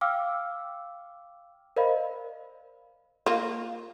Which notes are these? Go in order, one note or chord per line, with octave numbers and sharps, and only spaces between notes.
F5 G5 D6 E6 F6
A#4 C5 D5 D#5 F5 B5
A#3 F4